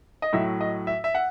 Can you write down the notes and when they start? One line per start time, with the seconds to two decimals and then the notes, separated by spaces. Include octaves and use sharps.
0.22 D#5
0.33 A2 F#3 E5
0.61 D#5
0.87 E5
1.04 E5
1.15 F#5